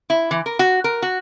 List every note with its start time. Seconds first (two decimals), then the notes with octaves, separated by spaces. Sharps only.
0.10 E4
0.31 E3
0.46 A#4
0.59 F#4
0.84 A#4
1.02 F#4